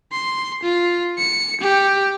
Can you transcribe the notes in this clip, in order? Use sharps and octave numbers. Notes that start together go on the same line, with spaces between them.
C6
F4
C#7
G4